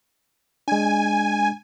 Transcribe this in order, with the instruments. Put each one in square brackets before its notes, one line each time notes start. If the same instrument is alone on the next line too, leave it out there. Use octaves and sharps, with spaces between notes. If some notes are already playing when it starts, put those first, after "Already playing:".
[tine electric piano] G#3 D4 [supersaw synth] G#5